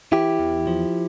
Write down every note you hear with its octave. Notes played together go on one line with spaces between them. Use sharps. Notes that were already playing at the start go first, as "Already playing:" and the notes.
E3 E4 G4
E2
F3